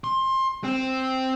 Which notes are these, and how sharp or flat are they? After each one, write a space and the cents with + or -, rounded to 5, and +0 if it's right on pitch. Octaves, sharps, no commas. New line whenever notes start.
C6 +20
C4 +0